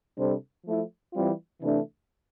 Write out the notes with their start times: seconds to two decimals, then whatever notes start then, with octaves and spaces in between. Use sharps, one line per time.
0.17 C3 G3 D4 A4 C5
0.64 F3 A3 E4
1.13 E3 G3 C4 F4
1.62 C3 E3 A3 D4